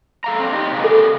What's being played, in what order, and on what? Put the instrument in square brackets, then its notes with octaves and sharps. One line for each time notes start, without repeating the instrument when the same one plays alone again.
[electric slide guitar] A4 F5 A#5
C4 D4
D#4 G4
C3 A#3 G#4
[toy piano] A4